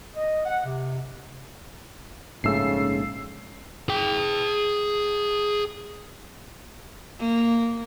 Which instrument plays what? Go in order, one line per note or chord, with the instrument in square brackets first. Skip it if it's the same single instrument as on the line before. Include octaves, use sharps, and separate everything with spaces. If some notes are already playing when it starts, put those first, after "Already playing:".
[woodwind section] D#5
F#5
C3
[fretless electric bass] A#1 G#2 A3 [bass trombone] C#3 [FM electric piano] E6 C7
[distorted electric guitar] G#4 G5
[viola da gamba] A#3